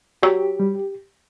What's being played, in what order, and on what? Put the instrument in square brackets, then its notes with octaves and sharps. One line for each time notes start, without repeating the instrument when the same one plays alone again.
[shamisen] F#3 [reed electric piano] G4
[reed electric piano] G3